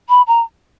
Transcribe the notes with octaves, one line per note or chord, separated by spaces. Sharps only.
B5
A#5